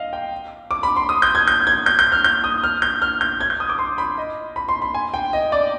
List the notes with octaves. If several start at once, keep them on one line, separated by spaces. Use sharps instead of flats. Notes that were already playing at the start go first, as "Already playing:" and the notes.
Already playing: D#5 F5
G5
D6
B5
C6
D#6
G6
G#6
G6
G#6
G6
G6
F6
G6
D#6
F6
G6
F6
G6
G#6
G6
D#6
D6
C6
B5
D#5
B5
C6
B5
G#5
G5
D#5
D5